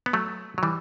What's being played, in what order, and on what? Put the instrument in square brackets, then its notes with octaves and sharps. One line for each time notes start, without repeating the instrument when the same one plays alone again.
[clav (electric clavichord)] B3
F#3 A3
F#3
E3 G3